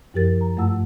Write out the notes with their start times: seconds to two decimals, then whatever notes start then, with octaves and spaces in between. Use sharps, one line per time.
0.14 F#2 F3 G4 A#4 A6
0.41 A#5
0.57 G2 A3 F4 F#5 A5 E6